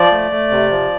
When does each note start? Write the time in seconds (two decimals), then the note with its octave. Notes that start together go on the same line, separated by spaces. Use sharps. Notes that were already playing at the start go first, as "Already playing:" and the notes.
Already playing: F3 D5
0.12 A3
0.32 A3
0.51 C3
0.71 F3